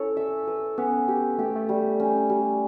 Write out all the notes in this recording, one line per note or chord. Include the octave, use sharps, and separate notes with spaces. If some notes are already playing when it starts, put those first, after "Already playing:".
Already playing: C#4 E4 A4 C#5
E5
B4
B3 C#4
G4
A3 G4
A3
G3
C#4
G3